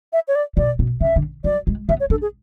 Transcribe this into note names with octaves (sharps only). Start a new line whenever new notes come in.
E5
C#5
D5
B2 D5
B2
C#3 E5
D3
F#3 D5
G#3
B3 E5
C#5
D4 A4
G#4